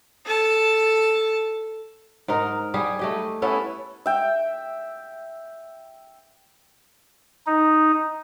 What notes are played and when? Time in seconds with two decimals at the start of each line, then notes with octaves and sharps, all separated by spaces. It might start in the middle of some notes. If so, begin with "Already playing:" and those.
0.25 A4 A5
2.28 G#2 D#4 A#4
2.74 G3 G4 G#4
2.99 A3 G4 D#5
3.42 B3 C#4 E4 A4
4.06 E5 G5
7.47 D#4